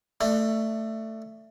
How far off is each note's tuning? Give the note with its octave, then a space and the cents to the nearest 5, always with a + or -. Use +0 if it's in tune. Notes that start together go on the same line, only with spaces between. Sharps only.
A3 +15 D4 +30